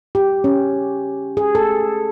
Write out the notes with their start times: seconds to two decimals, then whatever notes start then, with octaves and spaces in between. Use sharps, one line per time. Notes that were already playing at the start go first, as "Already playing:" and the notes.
0.15 G4
0.44 C#4
1.37 G#4
1.55 A4